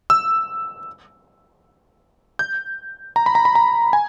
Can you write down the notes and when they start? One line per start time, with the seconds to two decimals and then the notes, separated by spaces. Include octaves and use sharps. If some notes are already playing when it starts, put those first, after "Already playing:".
0.10 E6
2.39 G6
3.16 A#5
3.26 B5
3.35 A#5
3.45 B5
3.55 A#5
3.93 G#5